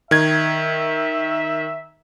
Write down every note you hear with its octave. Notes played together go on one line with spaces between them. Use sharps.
D#3 E5 G#6